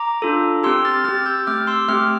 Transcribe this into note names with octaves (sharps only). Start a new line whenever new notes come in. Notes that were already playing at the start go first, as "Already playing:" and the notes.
Already playing: A#5 D6
D4 F4 A4
C4 G4 C6 E6
F6 A6
C4 G4 F6 A6
E6 G6
A3 C4 G4 D6 F6
C6 E6
A3 C4 G4 D6 F6